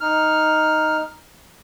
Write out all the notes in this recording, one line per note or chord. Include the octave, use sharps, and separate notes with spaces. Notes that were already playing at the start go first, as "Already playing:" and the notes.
D#4 F6